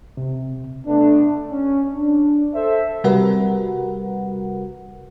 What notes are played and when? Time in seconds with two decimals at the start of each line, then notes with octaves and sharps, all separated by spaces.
0.17 C3
0.87 A3 B3 D4
1.51 C#4
1.94 D4
2.54 A4 C5 E5
3.04 C3 G3 F#4 A#4 B4 F#5